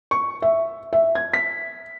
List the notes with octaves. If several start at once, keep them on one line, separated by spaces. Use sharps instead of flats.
C#6
E5
E5
G#6
B6